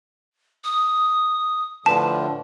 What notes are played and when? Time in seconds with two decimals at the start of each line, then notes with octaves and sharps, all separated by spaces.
0.64 D#6
1.86 A2 D3 F3 B4 A5